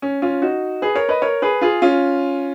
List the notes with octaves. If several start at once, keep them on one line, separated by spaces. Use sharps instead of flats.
C#4
C#4 F4
D#4 F#4
G#4 B4
A#4 C#5
B4 D#5
A#4 C#5
G#4 B4
F4 G#4
C#4 F4